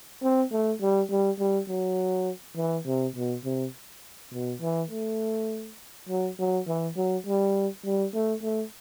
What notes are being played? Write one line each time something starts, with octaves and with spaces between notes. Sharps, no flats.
C4
A3
G3
G3
G3
F#3
E3
C3
B2
C3
B2
E3
A3
F#3
F#3
E3
F#3
G3
G3
A3
A3